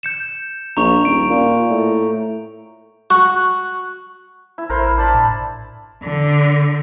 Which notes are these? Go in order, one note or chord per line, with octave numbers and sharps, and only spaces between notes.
G6 C#7 E7
A#1 A#5 C#6 F7
D#1 D7
A#2
A2
F#4
E4
A1 A#4 C5 B5
D4 A5 B5
A2
D3